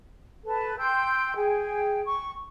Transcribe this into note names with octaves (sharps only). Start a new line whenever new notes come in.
A4 B4 A5
G5 C6 E6 G6
G#4 G5
C#6